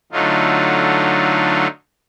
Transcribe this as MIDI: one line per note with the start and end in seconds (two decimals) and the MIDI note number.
0.12 1.67 50
0.12 1.67 54
0.12 1.67 57
0.12 1.67 63
0.12 1.67 65